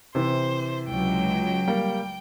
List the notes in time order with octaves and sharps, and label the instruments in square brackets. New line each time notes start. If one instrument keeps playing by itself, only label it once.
[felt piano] C3 E3 [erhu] C5
[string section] C#2 F#3 [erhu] G5
[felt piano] G3 A#3